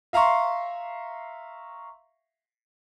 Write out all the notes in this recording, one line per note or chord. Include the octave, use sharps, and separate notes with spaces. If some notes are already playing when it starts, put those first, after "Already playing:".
E5 F5 A#5 C6 C#6